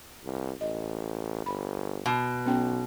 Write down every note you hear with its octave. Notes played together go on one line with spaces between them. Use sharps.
C2
A1 D#5
G1 B5
B2
B1 B3 C#4 G5